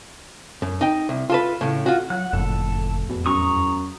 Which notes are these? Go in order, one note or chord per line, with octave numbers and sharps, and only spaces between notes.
F#2
D#4 G5
C2
F4 A4 B4
A2 C#3
F4 F#4
F#3 F#5 F#6
F#1 F2 A2 A4
E2 B2
F#2 A#5 C#6 D#6